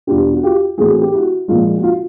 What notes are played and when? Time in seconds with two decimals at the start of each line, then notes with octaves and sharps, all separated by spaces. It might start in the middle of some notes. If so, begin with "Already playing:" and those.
0.07 E2 B2 G3 B3 D4 F4 G4
0.33 F#4
0.43 F4 G4
0.78 A2 E3 A3 C4 F#4 G#4
1.01 G4
1.13 E4 F#4
1.48 A#2 F3 G#3 F4
1.78 F#4
1.83 F4